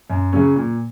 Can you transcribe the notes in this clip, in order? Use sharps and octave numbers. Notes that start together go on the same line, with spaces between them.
F#2
C#3 F#3 C#4
A#2